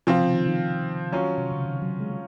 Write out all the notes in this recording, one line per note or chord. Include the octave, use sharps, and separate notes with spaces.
C3 F3 C4 F4
C#3
D#3
D#3
F#3 C#4 F4
C3
C#3
D#3
F#3
G#3
G#3